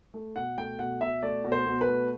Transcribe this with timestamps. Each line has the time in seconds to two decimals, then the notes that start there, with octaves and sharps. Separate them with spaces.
0.14 A3
0.36 B2 F#5
0.58 A3 G5
0.79 B2 F#5
1.01 B2 E5
1.23 A3 D5
1.44 B2
1.52 C5
1.66 B2
1.81 B4
1.88 A3